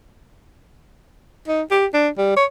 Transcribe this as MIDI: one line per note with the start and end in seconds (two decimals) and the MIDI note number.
1.48 1.62 63
1.71 1.86 67
1.94 2.08 62
2.18 2.32 55
2.36 2.45 73